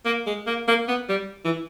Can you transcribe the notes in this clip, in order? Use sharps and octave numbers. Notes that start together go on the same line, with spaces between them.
A#3
G#3
A#3
A#3
B3
G3
E3